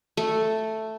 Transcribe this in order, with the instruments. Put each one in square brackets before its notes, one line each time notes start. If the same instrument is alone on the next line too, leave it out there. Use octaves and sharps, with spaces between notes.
[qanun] A3